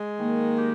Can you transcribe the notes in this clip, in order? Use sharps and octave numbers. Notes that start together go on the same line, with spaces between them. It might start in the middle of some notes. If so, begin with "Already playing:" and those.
Already playing: G#3
D#3 A#3
G4